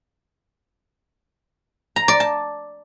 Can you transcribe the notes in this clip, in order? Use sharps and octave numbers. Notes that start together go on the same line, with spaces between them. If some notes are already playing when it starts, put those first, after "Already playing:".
A#5
D5
A5